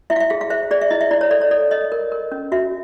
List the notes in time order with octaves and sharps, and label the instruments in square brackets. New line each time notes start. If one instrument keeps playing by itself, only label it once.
[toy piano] E4 E5
F5
E5
G#4 F5
F5
C5 E5
G#4 D5
E5
E4 D#5
E5
E4 D5
C#5
A4 D5
C#5
A4 D5
C#5 D#5
A#4
A#4
C#4
F#4 E5